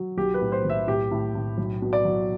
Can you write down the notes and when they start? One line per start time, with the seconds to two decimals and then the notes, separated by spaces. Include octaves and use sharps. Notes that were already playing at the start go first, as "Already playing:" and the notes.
Already playing: F#3
0.17 B1 G4
0.34 B4
0.41 A2
0.52 C5
0.65 B1 E5
0.87 A2 G4
1.11 A2
1.35 A2
1.58 B1
1.82 B2
1.93 D5
2.05 F#3